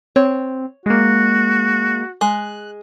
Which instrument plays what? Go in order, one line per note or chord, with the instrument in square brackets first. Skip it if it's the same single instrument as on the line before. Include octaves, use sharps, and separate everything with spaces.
[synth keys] C4 [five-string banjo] C#5
[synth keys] G#3 A#3 [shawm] F#4
[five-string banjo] G#3 [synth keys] F#6